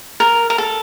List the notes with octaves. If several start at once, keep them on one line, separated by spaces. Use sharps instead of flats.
A#4
A#4
A4